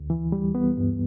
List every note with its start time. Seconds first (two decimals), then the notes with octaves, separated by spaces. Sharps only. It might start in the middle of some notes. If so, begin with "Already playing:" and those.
Already playing: D2
0.10 E3
0.32 G3
0.55 B3
0.77 G2